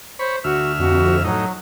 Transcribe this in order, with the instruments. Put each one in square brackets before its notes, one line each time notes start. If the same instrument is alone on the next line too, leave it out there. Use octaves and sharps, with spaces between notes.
[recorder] C5 [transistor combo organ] C#5 B5
[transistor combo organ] D2 E5 F6 [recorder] F#4
[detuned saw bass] F2 [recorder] F#4
[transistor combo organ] A2 D#4 [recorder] F#3